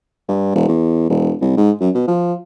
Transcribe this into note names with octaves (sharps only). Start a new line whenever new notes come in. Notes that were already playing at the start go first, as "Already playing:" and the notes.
G2
E1
E2
E1
C2
G#2
F#2
B2
F3